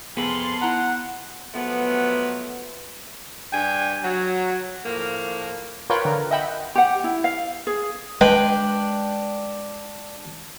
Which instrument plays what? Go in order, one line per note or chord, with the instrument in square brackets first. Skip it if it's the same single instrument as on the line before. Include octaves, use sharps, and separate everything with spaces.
[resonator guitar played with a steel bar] F2 C3 G#4 [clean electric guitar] B3 B4 [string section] F5 A5 C6
[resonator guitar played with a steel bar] E4 A#5 [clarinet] F#5
[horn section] F3 F#3 A3 B3
G2 D4 G5 G#5
F#3
A2 F3 A#3
[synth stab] F4 A#4 B4 C#5 G5
D3 A#4
D#5 E5 F#5 G5 B5
[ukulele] G4 F#5
E4
F5
G#4
[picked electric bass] G#3 [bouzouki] D4 [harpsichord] B4 [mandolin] G5